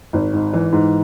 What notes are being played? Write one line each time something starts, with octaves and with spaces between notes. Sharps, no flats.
G#1
G#2
E3
G#2